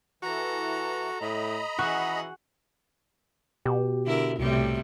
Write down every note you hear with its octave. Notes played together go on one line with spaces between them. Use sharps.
E3 F#4 A4 A#5
A2 D#5 A#5 B5
E3 F#4 G#4 F#5
B2 G4
D3 E4 A#4
C2 A2 C3 G3